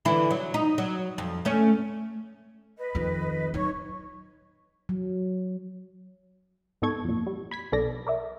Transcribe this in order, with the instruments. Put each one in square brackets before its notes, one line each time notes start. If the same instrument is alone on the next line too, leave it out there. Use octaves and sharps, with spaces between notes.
[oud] D3 E3 E4
F#3
D#4
F#3
F2
A3 C#4
[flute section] B4 D#5
[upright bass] F2 D#3
[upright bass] F#3 D#4 [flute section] C#5 C#6
[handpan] F#3
[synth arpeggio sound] G#2 B3 D#4 A4 C#6 G#6
F2 A#2
G3
B5 G#6 B6
B1 B3 A4 D5 A#6
A#4 D5 E5